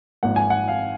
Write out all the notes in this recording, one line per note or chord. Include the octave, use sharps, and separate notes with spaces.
G#1 G#2 F3 A#3 F#5
G#5
F#5
F5